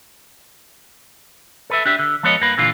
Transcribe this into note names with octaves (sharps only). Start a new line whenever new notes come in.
A4 B4 E5
D4 G4 E5
D3
F3 G#3 B3 B4 C#5 D#5
G2 A#3 B4
A#2 D3 E3 F4